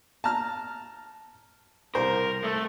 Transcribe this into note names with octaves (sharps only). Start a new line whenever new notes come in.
A5 A#5 F6
C2 A#4 C5
A3